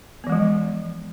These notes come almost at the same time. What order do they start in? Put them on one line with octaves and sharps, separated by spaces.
B3 E3 G#3 F3